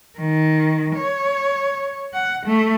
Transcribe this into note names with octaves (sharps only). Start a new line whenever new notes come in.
D#3
C#5
F#5
A3